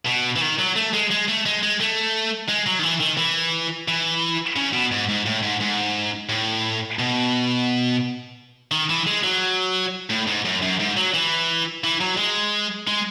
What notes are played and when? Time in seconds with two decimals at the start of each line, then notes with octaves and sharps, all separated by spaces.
0.06 B2
0.36 E3
0.41 D#3
0.59 F#3
0.76 A3
0.93 G#3
1.10 G#3
1.28 A3
1.46 G#3
1.63 G#3
1.80 A3
2.49 G#3
2.67 F#3
2.79 D#3
2.83 E3
3.00 D#3
3.18 E3
3.88 E3
4.56 C#3
4.74 B2
4.92 G#2
5.09 G#2
5.26 A2
5.43 G#2
5.60 G#2
6.29 A2
6.99 B2
8.72 D#3
8.89 E3
9.06 G#3
9.24 F#3
10.10 A2
10.27 G#2
10.45 F#2
10.62 F#2
10.80 G#2
10.97 F#3
11.14 E3
11.84 E3
12.01 F#3
12.17 G#3
12.88 G#3